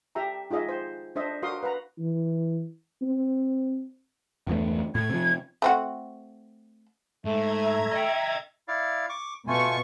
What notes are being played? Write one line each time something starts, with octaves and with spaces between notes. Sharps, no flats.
G4 E5 G5 A#5
D#4 F4 G#4 D#5 E5
C5
D4 C5 D#5 E5
F#4 A#4 F5 C6 D#6
B4 F5 F#5 A#5
E3
C4
G1 E2 A3
A2 G#6
C3 F3
A3 C4 F#4
G#2 A3 E5 A#5 G#6
D#5 G5
E4 D5 F5
C#6 D6
B2 A3 F4 G#5 C#6